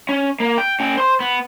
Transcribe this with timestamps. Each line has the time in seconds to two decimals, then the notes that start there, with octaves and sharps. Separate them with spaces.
0.09 C#4
0.40 A#3
0.58 G5
0.80 C#4 G5
0.97 C5 C6
1.20 B3